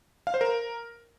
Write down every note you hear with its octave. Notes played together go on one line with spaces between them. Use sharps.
F5
C5
A#4